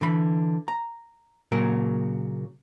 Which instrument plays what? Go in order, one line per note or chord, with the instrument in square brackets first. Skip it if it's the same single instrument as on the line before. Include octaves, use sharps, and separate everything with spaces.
[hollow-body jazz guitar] D3 E3 B5
A#5
A#2 C#3 F#3 A#4